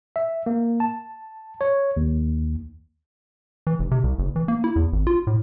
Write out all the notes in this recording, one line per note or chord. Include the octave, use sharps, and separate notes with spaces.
E5
A#3
A5
C#5
D#2
E3
F1
C3
C2
F#1
E3
A#3
E4
E2
G#1
F4
A2